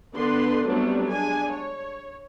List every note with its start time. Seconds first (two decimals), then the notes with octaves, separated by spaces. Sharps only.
0.15 D3 B3 D4 B4 C6
0.67 F#3 G3 A3 B3 C4 D4
1.09 G#3 D4 G#5
1.52 C#5